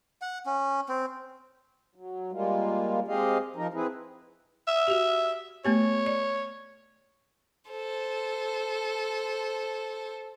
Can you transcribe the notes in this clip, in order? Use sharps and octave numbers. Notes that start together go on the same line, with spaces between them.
F#5
C#4
C4
F#3
G3 G#3 A#3 F4
G#3 C4 G4 G#4 D#5 F5
F3 D#4 A#4
C4 E4 G#4 B4
E5
F#4 G4
A3 B3 G4 C#5
D5
A4 C5